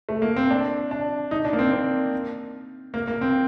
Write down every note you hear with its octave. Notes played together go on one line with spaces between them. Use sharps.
A3
A#3
C4
D4
D4
D#4
D4
A#3
C4
C4
A#3
A#3
C4